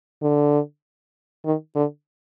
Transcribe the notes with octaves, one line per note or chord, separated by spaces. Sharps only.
D3
D#3
D3